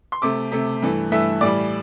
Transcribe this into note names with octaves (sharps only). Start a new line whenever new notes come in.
C6
C3 A3 D6
C3 A3
G2 E3 A3
G2 E3 A3 E5
A2 E3 G3 D5